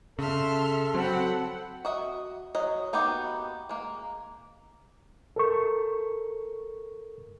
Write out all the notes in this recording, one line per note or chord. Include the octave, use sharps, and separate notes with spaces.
C#3 A4 E5 C6 F6
F#3 C4 A4 F#5 B5
F#4 D#5 E5
F#3 D#5
A#3 B3 D#4 F#4 G4
G#3 A#3
A4 A#4 C#6